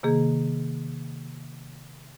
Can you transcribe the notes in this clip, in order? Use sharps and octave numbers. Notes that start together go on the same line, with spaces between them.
C3 D#3 A#3 G#4